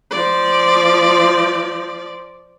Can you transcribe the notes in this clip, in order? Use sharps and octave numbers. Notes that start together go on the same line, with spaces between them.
F3 D5